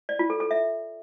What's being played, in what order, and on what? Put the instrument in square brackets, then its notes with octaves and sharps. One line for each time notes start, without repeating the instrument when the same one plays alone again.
[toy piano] D5
F4
A4
A4
E5